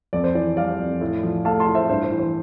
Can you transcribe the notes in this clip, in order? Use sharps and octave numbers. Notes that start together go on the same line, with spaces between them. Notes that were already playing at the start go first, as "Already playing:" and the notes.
F2 D5
C5
E3 D5
G3 D5 F5
F2
A2
F3
A3 F5 A5
A5 C6
A2
C5 E5
G2 C5
C5
E3
C5